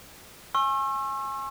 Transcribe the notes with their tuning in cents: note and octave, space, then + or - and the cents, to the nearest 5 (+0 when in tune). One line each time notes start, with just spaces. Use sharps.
G#5 +0 C#6 -40 E6 +25